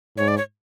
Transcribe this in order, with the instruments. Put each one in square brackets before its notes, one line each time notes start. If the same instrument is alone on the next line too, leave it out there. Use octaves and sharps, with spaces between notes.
[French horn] G#2 [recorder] C#5
[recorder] D5
C#5